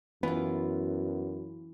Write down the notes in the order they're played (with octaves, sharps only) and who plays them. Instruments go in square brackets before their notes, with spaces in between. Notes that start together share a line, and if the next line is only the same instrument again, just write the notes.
[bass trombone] F#2 [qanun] E3 F4 [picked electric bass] B3